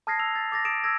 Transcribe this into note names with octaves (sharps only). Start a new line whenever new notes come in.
A5 D#6 F6 G#6 A#6 C7
E6 F7
A6
D6 A6 A#6
D#6 D7 E7
E6 G#6 A#6